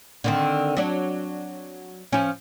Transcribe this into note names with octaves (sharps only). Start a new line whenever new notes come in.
D3 D#3 C4
F#3 D4
F3 C#4